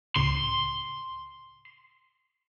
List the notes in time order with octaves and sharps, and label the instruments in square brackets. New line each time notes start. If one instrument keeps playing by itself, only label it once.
[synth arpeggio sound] C#2 A2 C#3 [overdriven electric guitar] C6